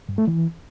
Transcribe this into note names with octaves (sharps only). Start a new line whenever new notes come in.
G2
A3
E3